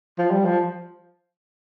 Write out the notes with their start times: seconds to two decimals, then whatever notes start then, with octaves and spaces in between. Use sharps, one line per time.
0.18 F3
0.31 G3
0.45 F3